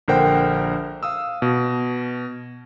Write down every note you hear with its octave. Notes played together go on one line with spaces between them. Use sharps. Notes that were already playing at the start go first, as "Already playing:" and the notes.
A#1 D3 A#4 C5 F#5 G5
F5 D#6 E6
B2